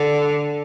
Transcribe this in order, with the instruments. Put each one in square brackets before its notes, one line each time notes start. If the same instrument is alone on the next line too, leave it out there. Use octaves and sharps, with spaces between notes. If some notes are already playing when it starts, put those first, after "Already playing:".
Already playing: [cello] D3